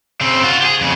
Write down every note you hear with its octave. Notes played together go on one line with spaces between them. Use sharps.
C#3 C4
F4 F#4
G4 G#4
F2 C#3